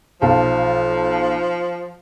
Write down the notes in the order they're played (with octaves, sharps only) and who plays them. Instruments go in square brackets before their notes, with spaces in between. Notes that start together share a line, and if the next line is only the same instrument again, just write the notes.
[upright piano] B1 F5 A5 [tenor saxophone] F3